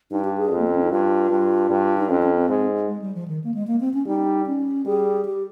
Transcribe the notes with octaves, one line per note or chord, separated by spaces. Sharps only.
G2 D#4
G4
G#4
F2
A#3
C4
C#4
D#4
G2 F4
G2
G2
D#4
F2 C#4
C#4
C4
G#2
G#3
G3
F3
D#3
A#3
G#3
A#3
C4
C#4
G3 D#4
C#4
G3 G#4
G4